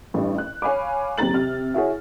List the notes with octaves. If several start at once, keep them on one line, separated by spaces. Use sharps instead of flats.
A1 G2
F#6
C#5 F5 G#5 B5 D6
F#1 D#2 C4 A#5 A6 F#7
C3 F6
E4 F#4 G#4 C#5